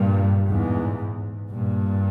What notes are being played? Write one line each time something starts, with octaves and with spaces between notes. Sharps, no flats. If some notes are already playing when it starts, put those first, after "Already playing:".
Already playing: G2 A#2
E2 G#2
G2 A#2